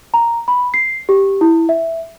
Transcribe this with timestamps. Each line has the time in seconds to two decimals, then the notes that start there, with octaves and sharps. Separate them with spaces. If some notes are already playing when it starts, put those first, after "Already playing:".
0.14 A#5
0.48 B5
0.74 C7
1.09 G4
1.41 E4
1.69 E5